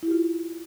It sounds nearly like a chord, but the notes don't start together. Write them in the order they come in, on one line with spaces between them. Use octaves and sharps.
E4 G4 F4